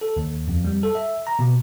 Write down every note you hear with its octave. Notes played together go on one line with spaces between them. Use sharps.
A4
D#2
F2
G3
A4
E5
A#5
B2